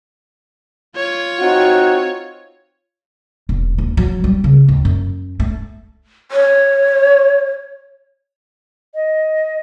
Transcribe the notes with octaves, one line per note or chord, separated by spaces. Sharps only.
F4 C#5
C4 D#4 F#4
E1
D#2
F#3
G3
C#3
D#2
F#2
A3
C#5
D#5